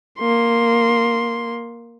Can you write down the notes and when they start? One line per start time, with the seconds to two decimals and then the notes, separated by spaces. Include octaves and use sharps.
0.19 A#3 C6